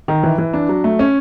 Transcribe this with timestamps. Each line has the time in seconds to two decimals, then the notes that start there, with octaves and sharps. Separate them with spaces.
0.08 D#3
0.23 E3
0.38 E3
0.53 D4
0.69 F#3
0.84 A3
0.99 C#4